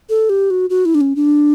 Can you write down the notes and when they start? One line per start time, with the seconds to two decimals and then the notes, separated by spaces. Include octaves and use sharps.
0.09 A4
0.30 G4
0.50 F#4
0.70 F#4
0.85 E4
0.95 D4
1.01 C#4
1.16 D4